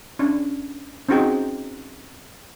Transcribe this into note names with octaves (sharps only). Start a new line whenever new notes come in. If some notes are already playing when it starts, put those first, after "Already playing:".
C#4 D4
C4 C#4 D#4 F#4 G#4 G5